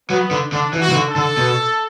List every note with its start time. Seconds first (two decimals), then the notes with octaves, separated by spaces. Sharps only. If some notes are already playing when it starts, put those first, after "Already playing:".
0.09 F#3 B3
0.31 D3
0.52 D3 D4
0.73 E3
0.81 F#4
0.89 E3
0.95 D3
1.09 A4
1.16 D3
1.37 B2